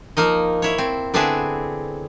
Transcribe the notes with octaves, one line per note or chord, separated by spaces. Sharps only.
F3 A#3 D#4 D#5
E4 C#5
C4
D3 B3 C4 D4 E4 G#4